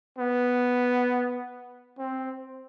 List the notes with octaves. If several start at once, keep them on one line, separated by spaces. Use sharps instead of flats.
B3
C4